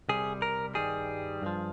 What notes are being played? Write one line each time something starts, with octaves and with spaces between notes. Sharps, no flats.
C2 C3 G3 G#4
A#4
G2 D#3 G3 G#4
G2 F3